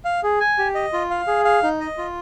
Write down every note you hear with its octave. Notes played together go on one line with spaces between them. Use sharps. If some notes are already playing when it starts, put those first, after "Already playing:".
F5
G#4
G#5
G4
D#5
F4
F5
G#4
F5
D#4
D#5
F4